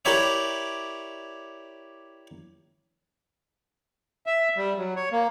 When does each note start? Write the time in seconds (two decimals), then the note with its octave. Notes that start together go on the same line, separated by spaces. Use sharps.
0.05 E4 G4 A#4 C#5 D5 E5
4.26 E5
4.57 G3
4.78 F#3
4.96 C#5
5.12 A#3